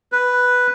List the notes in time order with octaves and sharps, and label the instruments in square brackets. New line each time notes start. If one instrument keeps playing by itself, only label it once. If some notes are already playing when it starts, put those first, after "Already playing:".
[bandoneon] B4